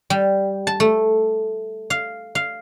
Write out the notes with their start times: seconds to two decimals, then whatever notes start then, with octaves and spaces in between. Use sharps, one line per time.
0.10 G3
0.67 A5
0.80 A3
1.90 F5
2.35 F5